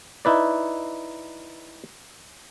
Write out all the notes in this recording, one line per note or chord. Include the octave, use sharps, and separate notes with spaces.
D#4 E4 B4 D5